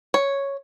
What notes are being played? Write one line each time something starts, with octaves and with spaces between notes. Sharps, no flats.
C#5